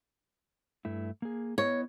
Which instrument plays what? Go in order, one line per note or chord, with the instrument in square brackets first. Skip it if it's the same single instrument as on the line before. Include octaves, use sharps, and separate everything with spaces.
[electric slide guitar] G2 A3 E4
A#3 G#4
[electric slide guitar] B3 E4 D#5 [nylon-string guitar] C#5